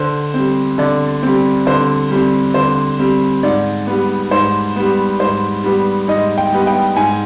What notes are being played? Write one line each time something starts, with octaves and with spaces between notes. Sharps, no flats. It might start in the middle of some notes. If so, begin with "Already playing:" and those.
Already playing: D3 C5
G3 C4
D3 D5
G3 C4
D3 C5
G3 C4
D3 C5
G3 C4
G#2 D5
G3 B3
G#2 C5
G3 B3
G#2 C5
G3 B3
G#2 D#5
G5
G3 B3
G5
G#2 G#5